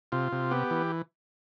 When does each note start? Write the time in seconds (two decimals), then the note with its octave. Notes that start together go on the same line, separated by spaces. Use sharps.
0.12 C3 F4
0.32 C3
0.51 B3 G4
0.71 E3